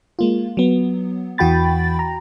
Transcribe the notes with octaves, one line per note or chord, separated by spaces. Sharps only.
G#3 A#3 F4
F#3 B3
E2 E3 F#4 G5 B5 A6
A#5